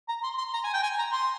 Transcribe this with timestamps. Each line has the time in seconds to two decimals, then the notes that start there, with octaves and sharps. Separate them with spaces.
0.08 A#5
0.23 C6
0.38 C6
0.53 A#5
0.64 G#5
0.73 G5
0.83 G#5
0.99 A#5
1.12 C6